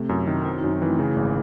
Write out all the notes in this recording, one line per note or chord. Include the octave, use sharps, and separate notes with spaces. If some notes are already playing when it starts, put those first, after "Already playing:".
Already playing: C3 A3 C4
F#2 E4
D#3 F#4
C4 E4
D#4
F#2
C#4
E3 A3
C#3
G#1